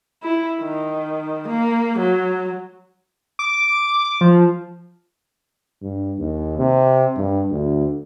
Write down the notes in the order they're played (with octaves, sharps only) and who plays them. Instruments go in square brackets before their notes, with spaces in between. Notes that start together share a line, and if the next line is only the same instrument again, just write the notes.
[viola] E4
D#3
A#3
F#3
[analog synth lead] D6
F3
[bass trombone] G2
D#2
C3
G2
D2